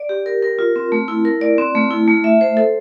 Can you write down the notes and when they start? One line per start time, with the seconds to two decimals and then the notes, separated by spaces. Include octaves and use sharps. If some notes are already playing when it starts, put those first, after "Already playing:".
Already playing: D5
0.09 G4
0.26 A#4
0.43 A#4
0.59 F4
0.76 C4
0.92 A3
1.08 E4
1.25 A#4
1.41 D5
1.58 C4
1.75 A3
1.91 E4
2.08 A3
2.24 E5
2.41 C5
2.57 A4